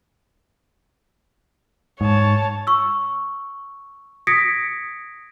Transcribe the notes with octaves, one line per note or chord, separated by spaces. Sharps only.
G#2 C#5 A5
C#6 E6
D#6 G#6 A#6 B6 C#7 D7